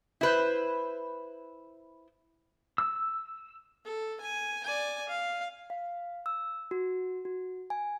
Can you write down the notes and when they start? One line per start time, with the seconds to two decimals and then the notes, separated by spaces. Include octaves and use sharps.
0.21 E4 B4 C5
2.78 E6
3.85 A4
4.21 G#5
4.64 D5 G#5
5.09 F5
5.70 F5
6.26 E6
6.71 F#4
7.25 F#4
7.70 G#5